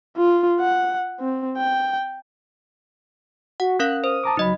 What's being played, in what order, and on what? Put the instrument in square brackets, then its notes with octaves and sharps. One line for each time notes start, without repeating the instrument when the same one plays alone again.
[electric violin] F4
F#5
C4
G5
[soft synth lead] F#4 [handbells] F#5
[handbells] C#4 A#4 F5 [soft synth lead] F#6
[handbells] C5 [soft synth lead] D#6
[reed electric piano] A5 A#5 D6
[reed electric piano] C#2 F#3 B5 [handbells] D#4 D#5